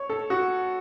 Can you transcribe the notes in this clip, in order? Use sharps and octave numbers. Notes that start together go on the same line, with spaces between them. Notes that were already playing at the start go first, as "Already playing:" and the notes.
Already playing: C#5
A4
F#4